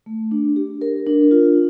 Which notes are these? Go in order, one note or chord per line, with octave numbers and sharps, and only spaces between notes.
A3
D4
G4
A#4
D4
F4